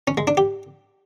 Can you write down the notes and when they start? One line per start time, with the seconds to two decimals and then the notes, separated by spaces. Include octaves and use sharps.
0.08 C#4
0.17 G#3
0.27 D4
0.37 G4